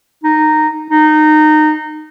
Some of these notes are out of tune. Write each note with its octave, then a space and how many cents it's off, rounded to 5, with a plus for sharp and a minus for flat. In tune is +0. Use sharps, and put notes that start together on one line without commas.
D#4 -10
D#4 -20